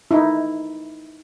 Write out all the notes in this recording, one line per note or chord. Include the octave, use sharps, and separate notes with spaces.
D#4 E4